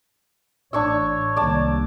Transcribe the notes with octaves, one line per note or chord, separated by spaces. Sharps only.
A1 D4 C#5 C#6 E6
C2 D#3 A#3 D5 A5